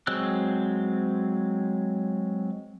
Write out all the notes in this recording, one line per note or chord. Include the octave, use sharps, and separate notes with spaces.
F#3 G#3 C4 E6 F#6